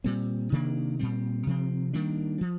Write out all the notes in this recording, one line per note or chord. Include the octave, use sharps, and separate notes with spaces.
A#2 G3 C4
C3 D#3 A#3 D4
A#2 G3 C4
C3 F3 C4
D#3 G3 A#3 D4
F3